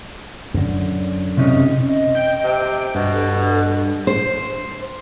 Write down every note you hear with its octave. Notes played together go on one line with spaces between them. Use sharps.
F#2 D3
C3 C#4 D#4
D#5
G5
C3
G2 B2 D#5
A4
C5